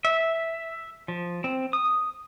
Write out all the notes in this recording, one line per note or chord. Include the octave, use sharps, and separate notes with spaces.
E5
F3
C4
D#6